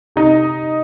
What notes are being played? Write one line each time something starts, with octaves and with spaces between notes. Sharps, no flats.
C3 D#4